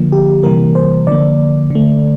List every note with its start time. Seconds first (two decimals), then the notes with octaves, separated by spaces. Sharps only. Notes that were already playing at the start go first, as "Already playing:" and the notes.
Already playing: D3 F3 A#3
0.12 G4
0.43 C3 E3 G3 A#3 A#4
0.75 C5
1.07 D3 F3 A#3 D5
1.70 D3 A3